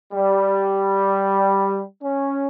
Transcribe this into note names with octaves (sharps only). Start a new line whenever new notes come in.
G3
C#4